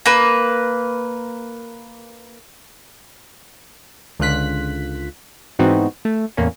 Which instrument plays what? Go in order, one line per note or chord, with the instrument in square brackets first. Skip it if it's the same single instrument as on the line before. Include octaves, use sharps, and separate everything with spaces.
[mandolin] A#3 B4
[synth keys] C#2 D3 F4 F#6 B6
G#2 E3 B3 C4 D#4 F#4
A3
E2 A2 A#3 C#4